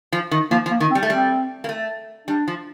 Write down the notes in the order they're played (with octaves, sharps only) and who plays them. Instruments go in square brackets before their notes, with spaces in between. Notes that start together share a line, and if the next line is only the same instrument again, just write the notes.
[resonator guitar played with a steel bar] F3
D#3
[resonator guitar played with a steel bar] F3 [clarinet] A#3
[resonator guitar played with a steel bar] F3
[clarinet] A#3
[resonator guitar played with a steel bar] D#3
[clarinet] C4
[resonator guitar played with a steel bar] G3
A3
[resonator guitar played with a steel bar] G3 [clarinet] C4
[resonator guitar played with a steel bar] A#3
A3
[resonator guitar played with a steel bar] G3 [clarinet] D4
[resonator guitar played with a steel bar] F3